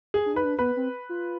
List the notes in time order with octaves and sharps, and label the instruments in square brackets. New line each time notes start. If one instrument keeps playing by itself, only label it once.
[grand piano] G#4
[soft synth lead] D4
[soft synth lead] D#4 [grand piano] B4
[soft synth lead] D4
[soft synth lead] B3 [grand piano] B4
[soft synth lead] C4
F4